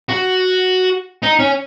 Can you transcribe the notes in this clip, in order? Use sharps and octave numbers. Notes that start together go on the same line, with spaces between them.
F#4
D#4
C#4